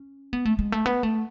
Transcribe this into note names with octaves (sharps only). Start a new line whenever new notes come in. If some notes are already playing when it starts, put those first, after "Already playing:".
Already playing: C#4
B3
A3
G#3
A3
B3
A3